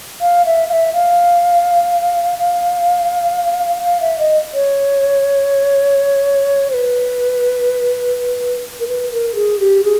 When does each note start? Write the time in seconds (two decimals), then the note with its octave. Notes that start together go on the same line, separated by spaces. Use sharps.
0.21 F5
0.46 E5
0.69 F5
0.73 E5
0.93 F5
2.38 F5
3.83 F5
4.01 E5
4.19 D#5
4.54 C#5
6.70 C5
6.74 B4
8.80 A#4
8.88 B4
9.12 A#4
9.35 G#4
9.60 G4
9.84 G#4